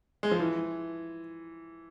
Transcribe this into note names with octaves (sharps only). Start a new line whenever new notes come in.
G#3
F3
E3